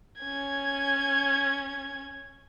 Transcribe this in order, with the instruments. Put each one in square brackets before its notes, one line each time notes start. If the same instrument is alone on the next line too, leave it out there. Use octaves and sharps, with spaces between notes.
[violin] C#4 G#6